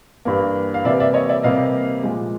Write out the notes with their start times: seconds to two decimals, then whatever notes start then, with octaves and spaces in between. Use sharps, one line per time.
0.25 G2 E3 G3 A#3
0.74 F5
0.84 C3 E3 G3 A#3 D5 E5
1.00 D5 E5
1.14 C#5 D#5
1.29 D5 E5
1.43 C3 E3 G3 A#3 D#5 F5
2.03 A#2 F3 G#3